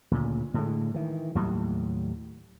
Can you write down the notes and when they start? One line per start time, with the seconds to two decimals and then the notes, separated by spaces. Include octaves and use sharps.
0.11 D2 A#2 C#3
0.54 A2 D3 G#3
0.94 D#3 E3
1.35 D#2 A2 F#3 G3